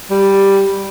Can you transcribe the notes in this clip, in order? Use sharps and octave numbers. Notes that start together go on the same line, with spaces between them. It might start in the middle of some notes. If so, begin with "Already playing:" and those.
G3